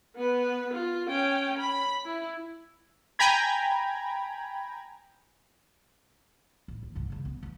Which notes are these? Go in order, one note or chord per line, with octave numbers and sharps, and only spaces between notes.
B3 B4
F4
C#4 G5
B5
E4
G5 G#5 A#5 B5 G#6
A1
D#2
C2 G2
C#3 E3
B3 C#4
E3 F3